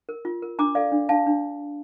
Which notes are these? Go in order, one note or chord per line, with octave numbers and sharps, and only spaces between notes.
A#4
F4
A#4
D4 A#5 D6
A4 D5 F5
D4
D4 F5 A5
D4